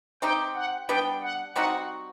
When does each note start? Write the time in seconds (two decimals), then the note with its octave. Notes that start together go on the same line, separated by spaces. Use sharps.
0.22 C4 D#4 G4 G5
0.55 F#5
0.89 G3 B3 D4 G5
1.23 F#5
1.55 G3 C4 D#4 F#4 F#5